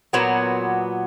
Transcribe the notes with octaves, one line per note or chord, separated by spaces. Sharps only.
A#2 F#3 B3